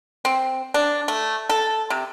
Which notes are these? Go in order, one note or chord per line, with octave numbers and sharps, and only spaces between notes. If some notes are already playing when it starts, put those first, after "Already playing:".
C4
D4
A3
A4
C3